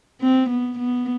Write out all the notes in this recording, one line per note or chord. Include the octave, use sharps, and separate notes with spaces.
C4
B3
B3